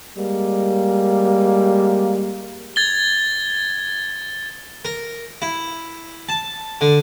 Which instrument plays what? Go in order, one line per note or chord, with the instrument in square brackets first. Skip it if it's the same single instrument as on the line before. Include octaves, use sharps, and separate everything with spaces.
[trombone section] G3 G#3 A#3
[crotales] G#6 A6 G7
[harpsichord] A#4
E4
A5
D3